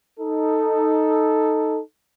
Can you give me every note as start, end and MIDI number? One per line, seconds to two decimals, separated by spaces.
0.20 1.80 63
0.20 1.80 69